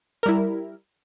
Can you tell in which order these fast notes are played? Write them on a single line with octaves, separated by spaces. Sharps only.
A#4 G3 E4